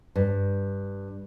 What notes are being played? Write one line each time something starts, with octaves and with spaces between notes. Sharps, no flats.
G2